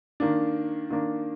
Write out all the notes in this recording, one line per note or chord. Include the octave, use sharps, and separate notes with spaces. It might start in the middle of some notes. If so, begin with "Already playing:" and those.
D#3 A#3 D4
D#3 A#3 D4